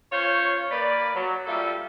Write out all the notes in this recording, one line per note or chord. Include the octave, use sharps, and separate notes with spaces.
C#4 F4 C5 C#5
A#3 B4 D5
F#3
G3 A#3 F4 A4 D5 E5